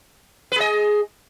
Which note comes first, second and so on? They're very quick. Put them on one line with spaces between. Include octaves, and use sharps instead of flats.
B4 G#4 D#5